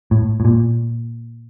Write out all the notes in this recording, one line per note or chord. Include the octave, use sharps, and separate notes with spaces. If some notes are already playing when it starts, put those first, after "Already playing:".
A2
A2
A#2